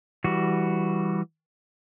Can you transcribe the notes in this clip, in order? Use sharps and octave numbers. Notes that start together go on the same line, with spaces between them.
E3 G3 F#4